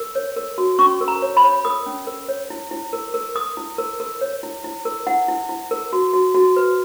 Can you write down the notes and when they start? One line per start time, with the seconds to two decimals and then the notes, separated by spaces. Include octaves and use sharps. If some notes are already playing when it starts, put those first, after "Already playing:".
Already playing: A#4
0.15 C#5
0.36 A#4
0.58 F#4
0.79 C#4 C#6
1.01 A#4
1.08 A#5
1.22 C#5
1.37 B5
1.44 C#5
1.65 A#4 D#6
1.86 C#4
2.07 A#4
2.29 C#5
2.50 E4
2.71 E4
2.93 A#4
3.14 A#4
3.35 A#4 D#6
3.57 E4
3.78 A#4
4.00 A#4
4.21 C#5
4.43 E4
4.64 E4
4.85 A#4
5.07 E4 F#5
5.28 E4
5.49 E4
5.71 A#4
5.93 F#4
6.13 F#4
6.35 F#4
6.56 B4